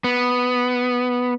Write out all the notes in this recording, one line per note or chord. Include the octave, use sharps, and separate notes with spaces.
B3